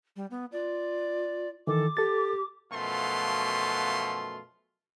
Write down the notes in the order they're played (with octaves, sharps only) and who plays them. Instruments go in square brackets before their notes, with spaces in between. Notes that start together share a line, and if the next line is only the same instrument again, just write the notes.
[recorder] G3
B3
[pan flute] F4 [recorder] D5
[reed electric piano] D#3 E3 [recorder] A4 [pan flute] D6
[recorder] G4 [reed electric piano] A4 A6
[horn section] F#2 B2 F3 A3 F4 C6